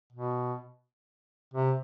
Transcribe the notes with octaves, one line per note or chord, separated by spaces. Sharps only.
B2
C3